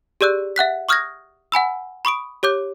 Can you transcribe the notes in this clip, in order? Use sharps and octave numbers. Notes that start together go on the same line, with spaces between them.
G4 G#4 D5 E6 F#6
E5 F#5 F#6 B6
C#6 D#6 F6 F#6 G#6 A#6
F#5 G#5 B5 E6
B5 C#6 D#6 D7
G4 C#5 D6 G6